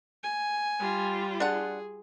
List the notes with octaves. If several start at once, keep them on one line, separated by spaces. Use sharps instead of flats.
G#5
G3 F4
D4 G#4 F#5